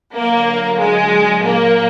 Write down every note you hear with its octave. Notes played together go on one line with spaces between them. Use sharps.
D3 F#3 A#3
G#3
A#2 F#3 A#3